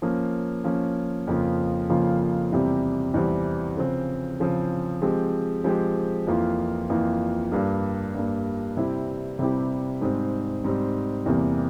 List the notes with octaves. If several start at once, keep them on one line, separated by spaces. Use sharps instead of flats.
F3 A#3 C#4
F3 A#3 C#4
F2 C#3 F3 A#3 F4
F2 C#3 F3 A#3 F4
E2 C3 G3 C4
E2 C3 G3 C4
C#3 F3 C4
C#3 F3 C4
F3 G#3 C4 G4
F3 G#3 C4 G4
F2 E3 A#3 F4
F2 E3 A#3 F4
G2 G3 A#3
G2 G3 A#3
C3 G3 C4 E4 G4
C3 G3 C4 E4 G4
G#2 G3 C4
G#2 G3 C4
E2 C3 G3 A#3